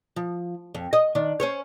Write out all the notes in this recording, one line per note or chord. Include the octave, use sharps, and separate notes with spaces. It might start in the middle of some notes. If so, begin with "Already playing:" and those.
F3
F2
D#5
D#3 D4
C#4 C5 C#5